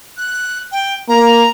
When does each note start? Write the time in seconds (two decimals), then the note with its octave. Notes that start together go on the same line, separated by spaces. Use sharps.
0.18 F#6
0.72 G5
1.09 A#3 A#5